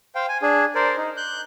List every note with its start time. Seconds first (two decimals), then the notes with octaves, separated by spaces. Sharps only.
0.15 C5 F5 G5
0.29 G#5
0.42 D4 G#4
0.75 A#4 C5 D5
0.96 D#4
1.17 F#6 G6